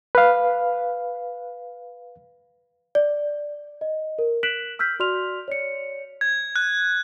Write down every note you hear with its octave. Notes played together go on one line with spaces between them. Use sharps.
B4 F5
D5
D#5
A#4
F#6 B6 D7 E7 F#7
E6 F6 G6 B6
F#4 D5 C6 F6 F7
C#5 D5 C#7
G#6
F#6